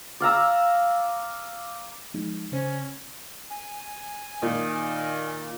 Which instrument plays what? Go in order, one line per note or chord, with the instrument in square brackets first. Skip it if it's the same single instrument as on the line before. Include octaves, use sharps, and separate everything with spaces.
[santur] D5 F5 A#5 E6
[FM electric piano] F3 G#3 D#4
[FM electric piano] C#3 C5 [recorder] C#4
[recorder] G#5
[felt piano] A#2 [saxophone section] D#3